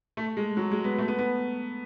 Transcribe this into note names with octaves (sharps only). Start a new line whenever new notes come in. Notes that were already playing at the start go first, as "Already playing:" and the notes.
A3
G#3
F#3
G#3
B3
A3
B3
B3